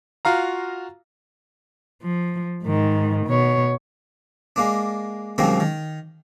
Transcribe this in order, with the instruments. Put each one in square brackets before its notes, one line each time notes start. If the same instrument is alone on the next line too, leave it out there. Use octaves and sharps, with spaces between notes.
[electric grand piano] F4 F#4 F5 A#5
[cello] F3
G#2 D#3
B2 C#5
[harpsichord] G#3 A#3 D4
C2 F#2 D#3 G#3 A#3 C4
D#3